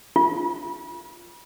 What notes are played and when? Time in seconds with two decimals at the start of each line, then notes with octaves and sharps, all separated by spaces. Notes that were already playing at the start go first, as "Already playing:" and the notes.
0.16 F4